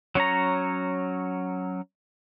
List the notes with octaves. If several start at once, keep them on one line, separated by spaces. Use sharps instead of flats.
F#3 C#4 C#5 A#5